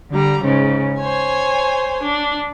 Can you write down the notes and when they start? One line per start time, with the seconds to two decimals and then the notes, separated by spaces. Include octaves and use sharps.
0.12 D3 G3 A#5
0.43 G#2 C#3 C#4
0.99 C5 C#5 G#5
2.03 D4